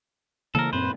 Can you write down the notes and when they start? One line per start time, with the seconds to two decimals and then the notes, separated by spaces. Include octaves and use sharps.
0.55 C#3 E3 A#3 A4 A#4
0.73 F#2 A#2 C4 B4 C5